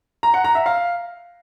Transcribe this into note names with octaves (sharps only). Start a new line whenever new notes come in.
A#5
F#5
A#5
E5
F5